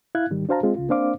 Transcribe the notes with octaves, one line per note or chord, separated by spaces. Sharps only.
E4 F5 F#6 G#6
G#2 D#3 G3
D4 F#4 C5 F5 A5 A#5
G#3 C4 F4 G#4
C#2 C#3 F4
A#3 C4 D4 C5 F5 D6